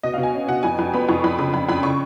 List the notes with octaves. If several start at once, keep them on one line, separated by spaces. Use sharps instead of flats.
B2 D#5
F5
B2
G#5
C#4
B2 F#5
F2 G#5
F2
B3 B5
F2 C#6
F2 B5
C#3 B5
F2 B5
F2 B5
C#3 C#6